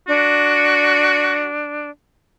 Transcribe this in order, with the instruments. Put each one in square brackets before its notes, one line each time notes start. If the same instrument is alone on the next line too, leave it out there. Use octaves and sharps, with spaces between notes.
[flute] D4 [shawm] F#4